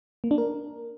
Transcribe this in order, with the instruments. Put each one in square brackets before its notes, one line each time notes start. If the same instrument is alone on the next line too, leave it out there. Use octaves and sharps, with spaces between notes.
[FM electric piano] A#3
D4
A#4